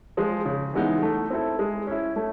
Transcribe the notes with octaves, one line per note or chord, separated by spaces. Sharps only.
F3 G#3
C#3
E3 G#3 B3 D#4
A3
C4 E4 A4
G#3
C#4 E4
A3